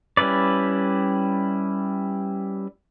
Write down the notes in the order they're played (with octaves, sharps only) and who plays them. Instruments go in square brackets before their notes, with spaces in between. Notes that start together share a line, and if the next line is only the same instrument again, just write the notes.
[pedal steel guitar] G3 C#4 E4 B4 D5